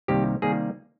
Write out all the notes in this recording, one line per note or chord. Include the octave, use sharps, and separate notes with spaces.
C2 C3 D#3 G3 A#3 G4
C3 D#3 G3 A#3 G#4